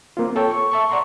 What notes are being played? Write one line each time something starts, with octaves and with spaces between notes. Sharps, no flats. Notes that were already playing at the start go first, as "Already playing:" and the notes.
A#3 C4 F4
A4 C#5 G5
C#6
E5 A5 C#6
D5 F#5 A#5 C6 C#6